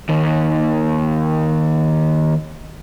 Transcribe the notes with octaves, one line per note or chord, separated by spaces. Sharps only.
D#2 D#3